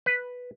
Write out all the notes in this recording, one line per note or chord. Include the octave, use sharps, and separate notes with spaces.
B4